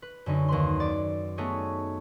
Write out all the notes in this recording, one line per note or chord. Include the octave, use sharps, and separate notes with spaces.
B4
F#2 D3 C#4 D#4
D#2 B4 C6
D5
A3 B3 D#4 G#4 C#5